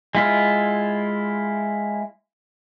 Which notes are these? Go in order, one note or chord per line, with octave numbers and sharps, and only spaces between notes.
G#3 E4 F4